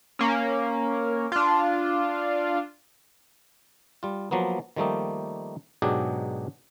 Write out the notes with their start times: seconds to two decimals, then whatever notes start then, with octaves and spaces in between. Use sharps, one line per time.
0.19 A#3 C#4
1.32 D4 F4
4.03 G3 F4
4.31 F3 F#3 A#3 B3
4.76 D#3 F3 G3 A3 A#3 D#4
5.82 G#2 B2 F#3 D4 G4 G#4